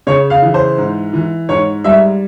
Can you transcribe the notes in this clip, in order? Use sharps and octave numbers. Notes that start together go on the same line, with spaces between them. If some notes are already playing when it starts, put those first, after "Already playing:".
C#3 C#5
F5
E3
C5
G#2
E3
G#2 C#5
G3 E5